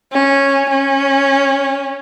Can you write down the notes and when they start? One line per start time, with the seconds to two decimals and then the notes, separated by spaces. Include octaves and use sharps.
0.13 C#4
0.70 C#4